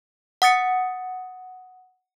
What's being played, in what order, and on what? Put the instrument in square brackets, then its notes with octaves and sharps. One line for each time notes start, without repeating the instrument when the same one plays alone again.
[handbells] F#5 D#6 A6 C#7